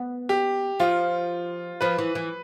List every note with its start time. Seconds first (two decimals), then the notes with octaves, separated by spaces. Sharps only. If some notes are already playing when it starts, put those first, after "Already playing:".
Already playing: B3
0.29 G4
0.80 F3 F4
1.81 F3 B4
1.99 E3
2.15 E3